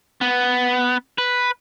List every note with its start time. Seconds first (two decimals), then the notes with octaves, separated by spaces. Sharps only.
0.21 B3
1.18 B4